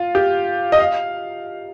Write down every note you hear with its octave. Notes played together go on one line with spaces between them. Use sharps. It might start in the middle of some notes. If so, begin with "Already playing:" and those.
Already playing: F4
G4
D#5
F5